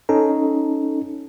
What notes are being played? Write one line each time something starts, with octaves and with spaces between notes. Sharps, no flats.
C#4 D#4 A4